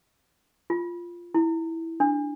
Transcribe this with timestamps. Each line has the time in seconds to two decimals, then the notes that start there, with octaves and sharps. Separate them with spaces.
0.70 F4
1.34 E4
2.00 D4